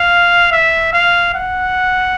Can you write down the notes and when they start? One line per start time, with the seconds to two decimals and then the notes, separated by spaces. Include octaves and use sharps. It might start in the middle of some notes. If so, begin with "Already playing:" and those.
Already playing: F5
0.52 E5
0.93 F5
1.34 F#5